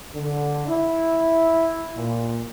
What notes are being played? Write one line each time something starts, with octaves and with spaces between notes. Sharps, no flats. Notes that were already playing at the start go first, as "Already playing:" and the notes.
D3
E4
A#2